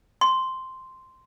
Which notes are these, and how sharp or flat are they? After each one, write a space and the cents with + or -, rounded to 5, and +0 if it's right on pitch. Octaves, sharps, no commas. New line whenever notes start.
C6 -5